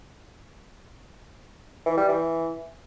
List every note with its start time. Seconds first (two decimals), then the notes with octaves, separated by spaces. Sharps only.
1.86 E3
1.97 G3
2.08 E3